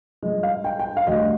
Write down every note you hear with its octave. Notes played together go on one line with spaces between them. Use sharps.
G2 F3 G#3 D#5
F5
G5
G5
F5
D2 D3 G3 D#5